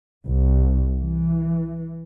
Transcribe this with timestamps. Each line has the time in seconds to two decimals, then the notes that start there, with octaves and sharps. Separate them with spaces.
0.25 C2
0.99 E3